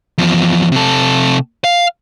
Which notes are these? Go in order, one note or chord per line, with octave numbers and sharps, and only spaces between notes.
E2 F3
C3 A4
F5